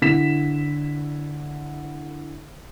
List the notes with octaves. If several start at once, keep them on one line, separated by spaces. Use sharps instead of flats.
D3 E4 B6 E7